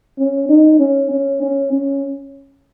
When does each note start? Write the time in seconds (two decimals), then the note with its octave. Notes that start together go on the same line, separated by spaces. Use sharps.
0.18 C#4
0.49 D#4
0.80 C#4
1.11 C#4
1.42 C#4
1.72 C#4